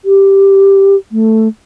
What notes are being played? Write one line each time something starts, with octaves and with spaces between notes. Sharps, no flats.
G4
A3